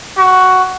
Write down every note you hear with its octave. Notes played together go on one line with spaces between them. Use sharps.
F#4